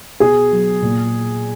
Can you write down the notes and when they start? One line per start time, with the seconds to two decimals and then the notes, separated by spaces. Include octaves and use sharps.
0.20 B2 G#4
0.52 F#3
0.82 A#2